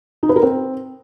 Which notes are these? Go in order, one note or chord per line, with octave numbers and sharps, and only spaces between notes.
D#4
B4
A#4
C4